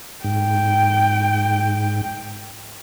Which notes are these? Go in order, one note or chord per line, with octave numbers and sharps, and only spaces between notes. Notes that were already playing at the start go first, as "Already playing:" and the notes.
G#2 G5